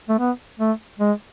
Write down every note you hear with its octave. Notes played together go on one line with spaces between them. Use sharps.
A3
B3
A3
G#3